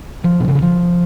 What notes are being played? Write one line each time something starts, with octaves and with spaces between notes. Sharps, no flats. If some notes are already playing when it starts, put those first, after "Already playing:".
F3
B2
C#3
D3
F3